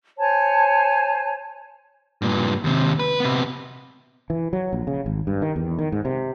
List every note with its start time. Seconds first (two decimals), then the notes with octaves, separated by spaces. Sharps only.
0.18 C5 C#5 G#5 A5
2.22 G2 A#2
2.64 D#2 C3
2.99 B4
3.20 C3 B3
4.30 E3
4.53 F#3
4.73 A#1
4.87 C#3
5.06 G#1
5.27 G2
5.42 D#3
5.56 E2
5.79 D#3
5.92 G#2
6.05 C3